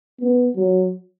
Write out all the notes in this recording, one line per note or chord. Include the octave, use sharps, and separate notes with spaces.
B3
F#3